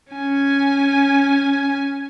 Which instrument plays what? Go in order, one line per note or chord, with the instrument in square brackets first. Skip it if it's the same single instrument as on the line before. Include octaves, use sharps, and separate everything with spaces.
[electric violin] C#4 G#5